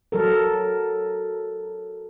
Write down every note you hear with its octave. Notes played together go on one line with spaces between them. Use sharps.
F#3 A4 A#4